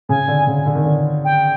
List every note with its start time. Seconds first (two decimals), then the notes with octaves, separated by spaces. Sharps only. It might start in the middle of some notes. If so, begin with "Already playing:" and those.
0.09 C#3 G#5
0.28 D3
0.47 C#3
0.66 D3
0.75 D#3
0.84 D3
1.25 G5